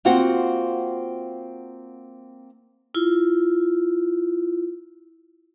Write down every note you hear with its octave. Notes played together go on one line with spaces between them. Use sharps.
A#3 C4 F4 F#4 C5 F#5
E4 F4